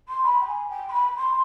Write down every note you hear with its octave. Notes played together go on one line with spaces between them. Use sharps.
C6
B5
G5
G#5
G5
C6
B5
C6